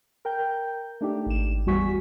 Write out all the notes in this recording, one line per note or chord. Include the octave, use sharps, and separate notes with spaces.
A#4 G5 G6
A3 D4 D#4 G4
G#1 E7
E2 G3 F#4 G#5 C#6 B6